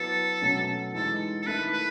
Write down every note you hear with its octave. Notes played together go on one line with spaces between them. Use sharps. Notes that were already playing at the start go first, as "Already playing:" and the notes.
Already playing: F#3 B3 E4 A4
B2 F#3 A3 C#4
E3 G#3 D#4 A4
A4
D#3 A3 E4 B4
B4